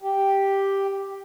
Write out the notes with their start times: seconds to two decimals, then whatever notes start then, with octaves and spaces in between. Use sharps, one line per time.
0.02 G4